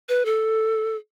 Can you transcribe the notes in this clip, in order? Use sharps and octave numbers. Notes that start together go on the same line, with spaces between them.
B4
A4